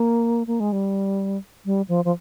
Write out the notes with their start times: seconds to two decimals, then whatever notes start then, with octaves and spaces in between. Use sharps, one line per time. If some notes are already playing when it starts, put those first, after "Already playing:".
Already playing: A#3
0.47 A#3
0.60 G#3
0.72 G3
1.66 G3
1.89 F3
2.05 F3